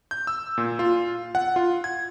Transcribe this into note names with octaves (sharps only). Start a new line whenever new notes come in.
G6
E6
A#2
F4
F#5
F4
G#6